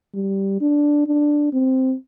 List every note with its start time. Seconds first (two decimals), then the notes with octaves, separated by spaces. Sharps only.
0.14 G3
0.61 D4
1.07 D4
1.53 C4